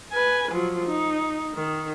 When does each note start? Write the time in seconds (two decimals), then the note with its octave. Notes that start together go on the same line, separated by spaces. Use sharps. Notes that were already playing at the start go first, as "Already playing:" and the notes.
0.13 B4 G#5
0.52 F3 F#3
0.86 D#4
1.54 D#3